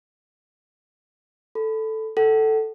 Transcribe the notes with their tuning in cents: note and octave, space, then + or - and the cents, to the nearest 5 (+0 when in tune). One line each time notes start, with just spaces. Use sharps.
A4 +0 B5 +20
A4 +0 F#5 +35